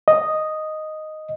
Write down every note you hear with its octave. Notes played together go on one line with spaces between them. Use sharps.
D#5